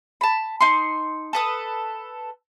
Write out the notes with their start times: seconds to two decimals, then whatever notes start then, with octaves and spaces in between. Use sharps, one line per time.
0.21 A5 B5
0.60 D#4 C6
1.33 A4 B4 D#6